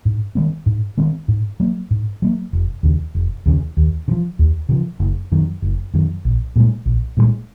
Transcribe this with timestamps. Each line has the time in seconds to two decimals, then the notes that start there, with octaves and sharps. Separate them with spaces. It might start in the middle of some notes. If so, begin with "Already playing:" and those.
0.05 G#2
0.35 D#3 G#3 C4
0.66 G#2
0.98 D#3 G#3 C4
1.28 G#2
1.60 F#3 A#3
1.91 G#2
2.22 F#3 A#3
2.53 F1
2.83 D#2 C#3
3.15 F1
3.46 D#2 C#3
3.77 D#2
4.08 C#3
4.11 F3
4.39 D#2
4.69 C#3 F3
5.00 F#1
5.32 F#2 D#3
5.62 F#1
5.94 F#2 D#3
6.25 A#1
6.56 A#2 F3
6.60 G#3
6.86 A#1
7.17 A#2 F3
7.22 G#3